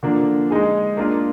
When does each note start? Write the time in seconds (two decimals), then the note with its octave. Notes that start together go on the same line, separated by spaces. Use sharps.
0.03 D3 F3 A#3 D4
0.50 G#3 D#4 G#4
0.97 A#3 D4 F4